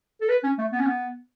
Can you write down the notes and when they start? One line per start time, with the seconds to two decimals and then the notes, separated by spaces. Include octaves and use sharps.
0.21 A4
0.29 B4
0.43 C#4
0.58 A3
0.72 B3
0.80 C#4
0.87 B3